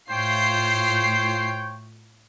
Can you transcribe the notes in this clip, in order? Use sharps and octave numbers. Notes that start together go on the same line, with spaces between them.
A2 F4 C5 C#5 G5 C7